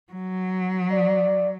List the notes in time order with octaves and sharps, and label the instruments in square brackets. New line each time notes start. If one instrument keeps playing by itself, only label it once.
[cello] F#3
[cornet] D5